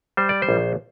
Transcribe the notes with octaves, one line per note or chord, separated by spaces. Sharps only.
G3 C5
D5
C5
A#1